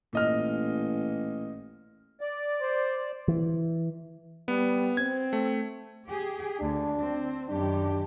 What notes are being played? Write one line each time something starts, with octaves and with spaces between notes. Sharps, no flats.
A1 A#2 D#5 F6
D5
C5
E3
G3 B3
C4 G#6
A3
G4 G#4
D2 D4
C4
F#2 D#3 D4 G4